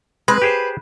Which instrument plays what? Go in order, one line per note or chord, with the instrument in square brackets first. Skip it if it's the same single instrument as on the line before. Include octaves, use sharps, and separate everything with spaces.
[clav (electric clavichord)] G#3 C4 [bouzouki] B4
[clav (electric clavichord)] G4 G#4 C5